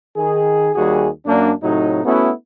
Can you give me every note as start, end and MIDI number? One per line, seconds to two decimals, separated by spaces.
0.16 0.71 51
0.16 0.71 68
0.75 1.08 39
0.75 1.08 55
0.75 1.08 66
0.75 1.08 68
1.26 1.52 42
1.26 1.52 58
1.26 1.52 62
1.63 2.03 45
1.63 2.03 48
1.63 2.03 54
1.63 2.03 63
2.05 2.30 57
2.05 2.30 59
2.05 2.30 61
2.05 2.30 64
2.05 2.30 66